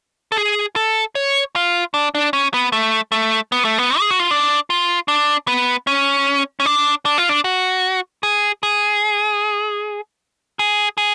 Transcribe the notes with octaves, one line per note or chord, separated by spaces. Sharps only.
A4
G#4
A4
C#5
F4
D4
D4
C#4
B3
A3
A3
B3
A3
B3
G#4
F#4
F4
D4
F4
D4
B3
C#4
C#4
D4
D4
F4
D4
F#4
G#4
G#4
G#4
G#4